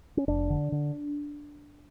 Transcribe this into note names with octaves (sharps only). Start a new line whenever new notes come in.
C#4
F1 D4
D3
D3